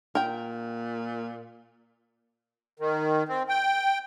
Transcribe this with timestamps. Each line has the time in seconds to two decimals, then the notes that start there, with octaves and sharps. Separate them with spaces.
0.15 A#2 A#4 G5
2.80 D#3
3.29 C4
3.49 G5